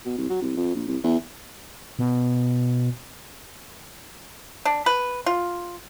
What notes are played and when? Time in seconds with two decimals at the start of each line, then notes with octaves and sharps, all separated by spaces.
0.05 B2
0.18 C2
0.29 F#3
0.42 C2
0.57 F2
0.75 A#1
0.88 C2
1.04 E2
1.99 B2
4.65 D4
4.86 B4
5.26 F4